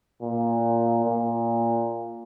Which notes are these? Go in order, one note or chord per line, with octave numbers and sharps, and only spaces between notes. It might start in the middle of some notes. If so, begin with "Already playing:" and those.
A#2
A#2